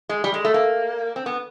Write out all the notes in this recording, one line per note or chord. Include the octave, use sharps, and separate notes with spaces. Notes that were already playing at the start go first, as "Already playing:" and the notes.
G#3
G3
G#3
A3
A#3
C4
B3